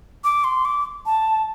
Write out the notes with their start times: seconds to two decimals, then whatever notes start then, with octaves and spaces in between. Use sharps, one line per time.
0.24 D6
0.44 C6
0.65 D6
1.06 A5